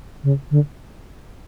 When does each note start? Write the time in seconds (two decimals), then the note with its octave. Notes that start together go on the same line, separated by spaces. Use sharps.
0.23 C#3
0.51 D3